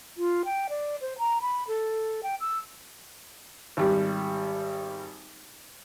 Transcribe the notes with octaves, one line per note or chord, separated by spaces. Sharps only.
F4
G5
D5
C5
A#5
B5
A4
G5
E6
G#1 G3